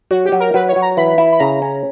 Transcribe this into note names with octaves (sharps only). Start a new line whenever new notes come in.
F#3 F#4
G4
F#3
A#4
F#3 B4
C#5
F#3
A#5
E3 B5
E4
B5
C#3 A#5
C#4